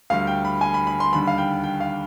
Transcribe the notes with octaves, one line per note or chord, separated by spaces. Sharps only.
D2 D3 G3 F5
G5
B5
G#5
B5
B5
C6
D#2 D3 G3 B5
F5
G5
G5
F5